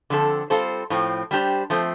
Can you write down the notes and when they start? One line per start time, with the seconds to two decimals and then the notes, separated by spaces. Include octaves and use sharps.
0.10 D3 F3 C4 A4
0.50 G3 C4 F4 A4 C5
0.90 A2 F3 C4
1.31 G3 D4 G4 C5
1.70 F3 A3 C4